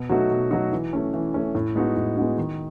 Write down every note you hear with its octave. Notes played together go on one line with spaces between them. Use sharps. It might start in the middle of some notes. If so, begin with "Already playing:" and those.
Already playing: B2
F#3 A3 D#4 F#4
B2
F#3 A3 D#4 F#4
E3
A3 C#4
E3
A3 C#4
A2
G#3 B3 D#4 F#4
A2
G#3 B3 D#4 F#4
D#3